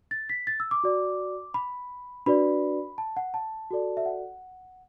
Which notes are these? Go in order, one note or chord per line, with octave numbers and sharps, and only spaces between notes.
A6
B6
A6
E6
D6
F#4 D5
B5
D4 F#4 B4 D5 B5
A5
F#5
A5
F#4 A4 D5
E5
F#5